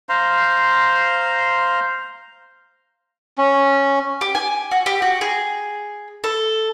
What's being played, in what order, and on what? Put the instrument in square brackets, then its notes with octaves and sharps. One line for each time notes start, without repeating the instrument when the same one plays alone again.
[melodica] C5 F5 A#5 C6
C#4
[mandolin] G4
G#5
F#4
G4
F#4
G#4
A4